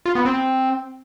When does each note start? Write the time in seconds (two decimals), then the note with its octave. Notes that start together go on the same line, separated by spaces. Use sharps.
0.06 F4
0.15 B3
0.25 C4